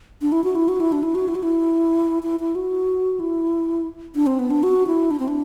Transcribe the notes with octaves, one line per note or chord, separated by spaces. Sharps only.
D4
E4
F#4
E4
F#4
E4
D4
E4
F#4
E4
F#4
E4
E4
E4
F#4
E4
D4
C4
B3
D4
F#4
E4
D4
C4
D4